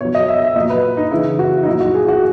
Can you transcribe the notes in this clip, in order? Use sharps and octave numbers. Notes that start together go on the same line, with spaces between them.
B2 F#3 C#5
D#5
E5
E5
A#2 F#3 D#5
B4
D#4
C#3 E3 E4
F#4
D#4
A#2 F#3 E4
F#4
G#4
F#4